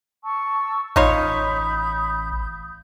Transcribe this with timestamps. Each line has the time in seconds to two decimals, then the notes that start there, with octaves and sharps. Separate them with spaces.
0.23 A5 C#6 E6
0.96 A1 D#4 F4 C#5 B5 D#6 G6